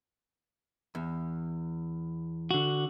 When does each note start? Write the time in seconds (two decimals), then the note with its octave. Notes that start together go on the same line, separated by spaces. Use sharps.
0.95 E2
2.51 D3 F#4